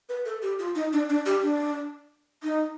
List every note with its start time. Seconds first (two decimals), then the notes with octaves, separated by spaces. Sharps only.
0.09 B4
0.26 A4
0.42 G4
0.59 F4
0.75 D#4
0.93 D4
1.09 D4
1.26 G4
1.43 D4
2.43 D#4